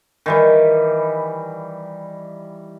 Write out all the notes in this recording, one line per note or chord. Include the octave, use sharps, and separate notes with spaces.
D#3 E3 G3